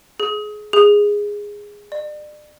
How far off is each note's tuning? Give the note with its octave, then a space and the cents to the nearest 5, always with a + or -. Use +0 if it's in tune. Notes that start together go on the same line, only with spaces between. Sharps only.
G#4 +25
G#4 -10
D5 +35